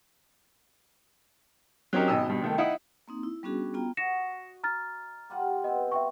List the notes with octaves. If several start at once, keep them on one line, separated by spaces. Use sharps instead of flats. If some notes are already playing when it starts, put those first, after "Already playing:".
F#3 C4 C#4 D#4 G4 A#4
G#1 B2 D#5 G5 E6
G2 B2
C2 D#3 A3
D#4 E4 F#5 D#6
A#3 C4 D#4
E4
G3 B3 C#4 D4 F#4 G#4
B3 F4 G5 A#5
F#4 D#5 A#6 C#7 E7
A#5 F6 A6
G3 F4 F#5
B3 C4 D#5
E5 G5 C#6